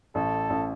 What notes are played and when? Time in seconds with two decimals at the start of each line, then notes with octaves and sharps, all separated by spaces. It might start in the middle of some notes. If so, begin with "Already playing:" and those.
0.15 A1 A4
0.50 A1